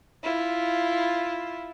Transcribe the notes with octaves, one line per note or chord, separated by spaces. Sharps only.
E4 F4